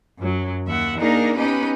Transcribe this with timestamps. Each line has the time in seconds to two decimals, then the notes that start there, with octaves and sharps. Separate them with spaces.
0.18 F#2 F#3
0.66 D#2 E5 F#5
0.99 A#3 D4 D#4 G#4 A#4
1.36 B3 C#4 D#4 G4 B4 D#5